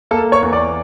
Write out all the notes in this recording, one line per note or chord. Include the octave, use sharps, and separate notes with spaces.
A#3 A4 A5
C#5 C#6
E2
D5 D6